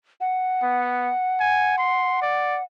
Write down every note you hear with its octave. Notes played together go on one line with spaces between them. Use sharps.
F#5
B3
G#5
C6
D5